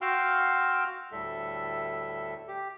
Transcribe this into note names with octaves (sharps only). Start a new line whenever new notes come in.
F#4 F5 G5 C6 E6 F6
D2 A2 G3 A4 E5
G4